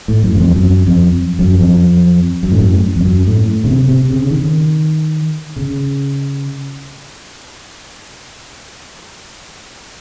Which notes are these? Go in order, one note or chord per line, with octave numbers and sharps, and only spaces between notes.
A2
F#2
F#2
F2
F#2
F2
F#2
F2
F#2
A2
F#2
F2
F#2
A2
C#3
C3
C3
C#3
D#3
C#3